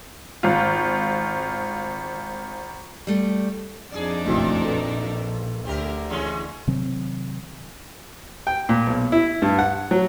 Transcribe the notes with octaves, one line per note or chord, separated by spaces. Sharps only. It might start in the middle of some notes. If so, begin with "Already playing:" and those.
G#1 F4
G3 A3
F2 D4 D#4 G#4 A4 D5
F#1 B1 D#3 A3 C4 E4 F#4
A#1 A4 B4
D2 D3 C4 G4 A#4
E3 G#3 C#4
C3 D#3 F#3 C4
G5
A#2
B1
E4
G2
F#5
F#3